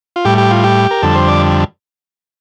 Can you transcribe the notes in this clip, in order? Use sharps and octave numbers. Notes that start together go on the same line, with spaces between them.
F4
A2 G3 G4
G4
F4
G4
A#4
F2 D3 G3 A4
C5
D5